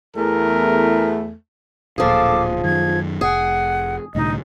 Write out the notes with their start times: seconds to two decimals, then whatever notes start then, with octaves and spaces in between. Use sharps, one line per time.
0.16 E2 A3 A#4
1.98 D1 A#2 F3 G#4 A4 F5 D6
2.64 F#2 D#3 G#6
3.21 F1 G#4 F#5
4.15 C2 A2 D3 D#4 D#5